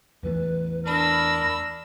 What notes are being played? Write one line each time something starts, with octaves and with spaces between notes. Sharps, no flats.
E2 E3 A3 B4
D4 A#4 B5 E6